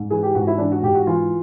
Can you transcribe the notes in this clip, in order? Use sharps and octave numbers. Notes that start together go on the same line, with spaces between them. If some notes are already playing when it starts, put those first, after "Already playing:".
Already playing: G#2
E3 G#4
G4
G#2 F#4
E4
E3 D4
F#4
G#2 G4
F#4
E3 F4